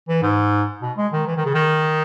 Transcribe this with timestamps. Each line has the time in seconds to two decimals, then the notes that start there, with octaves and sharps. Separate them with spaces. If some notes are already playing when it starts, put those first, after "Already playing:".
0.09 E3
0.22 G#2
0.82 B2
0.97 G#3
1.12 D#3
1.27 E3
1.36 D#3
1.45 C#3
1.54 D#3